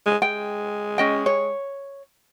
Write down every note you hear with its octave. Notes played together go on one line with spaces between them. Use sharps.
G#3
G#3 G5
C#4 D#5 G5
C#5